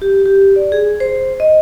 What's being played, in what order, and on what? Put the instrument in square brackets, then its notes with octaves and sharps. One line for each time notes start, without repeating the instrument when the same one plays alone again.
[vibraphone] G4
G4
D5
G#4
C5
D#5